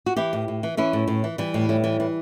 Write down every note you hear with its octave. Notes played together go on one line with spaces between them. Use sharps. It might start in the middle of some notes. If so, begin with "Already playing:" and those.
F#4
E3 E4 G4
A2
A2
E3
E3 C#4 E4
A2
A2
E3
E3 G3
A2
A2
E3
E3